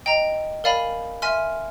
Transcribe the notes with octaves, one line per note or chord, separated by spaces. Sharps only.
D#5 G5 A#5
A#4 D5 F5 G#5 B5
E5 G#5 C6 F6